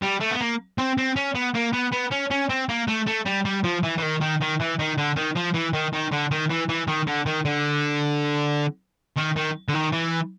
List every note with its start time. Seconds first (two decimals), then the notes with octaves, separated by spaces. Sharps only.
0.02 G3
0.20 A3
0.31 B3
0.40 A#3
0.78 C4
0.98 C4
1.16 C#4
1.35 B3
1.55 A#3
1.73 B3
1.92 B3
2.12 C#4
2.31 C#4
2.50 C4
2.69 A#3
2.88 A3
3.07 A3
3.26 G3
3.45 G3
3.64 F3
3.83 E3
3.98 E3
4.02 D#3
4.21 D#3
4.41 D#3
4.60 E3
4.79 D#3
4.98 D3
5.17 D#3
5.36 F3
5.55 E3
5.73 D#3
5.93 D#3
6.12 D3
6.31 D#3
6.50 E3
6.69 E3
6.88 D#3
7.07 D3
7.26 D#3
7.45 D3
9.16 D#3
9.36 D#3
9.69 D3
9.74 D#3
9.92 E3